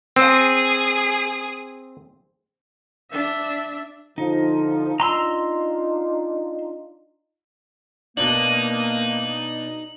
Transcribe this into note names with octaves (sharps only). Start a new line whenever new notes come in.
C4 G#4 D#6
D4 E5
D3 F3 D#4
D4 D#4 F4 A#5 C6 E6
B2 A#3 D4 D#4 F#7